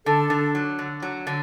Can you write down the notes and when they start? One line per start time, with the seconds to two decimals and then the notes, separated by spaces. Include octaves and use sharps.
0.06 D3 A4
0.30 D3
0.55 F#3
0.79 D3
1.02 F#3
1.27 D3